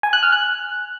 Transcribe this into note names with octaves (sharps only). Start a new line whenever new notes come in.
G#5
F#6
F6
F#6